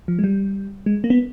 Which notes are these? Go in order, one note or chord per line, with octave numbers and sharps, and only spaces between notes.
F3
G#3
G3
G#3
A#3
B3